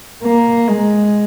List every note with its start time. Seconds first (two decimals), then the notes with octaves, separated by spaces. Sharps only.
0.24 A#3
0.68 G#3